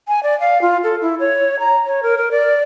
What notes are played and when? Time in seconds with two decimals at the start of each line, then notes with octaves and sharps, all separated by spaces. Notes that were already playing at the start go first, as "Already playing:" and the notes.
0.08 G#5
0.23 D5
0.40 F5
0.62 F4
0.84 A4
1.02 E4
1.20 C#5
1.59 A#5
1.86 C#5
2.03 A#4
2.18 A#4
2.31 D5